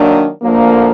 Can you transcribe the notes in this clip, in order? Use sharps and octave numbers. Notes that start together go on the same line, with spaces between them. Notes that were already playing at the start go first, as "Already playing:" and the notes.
Already playing: D#3 F#3 A#3 D4
D2 D3 F3 A#3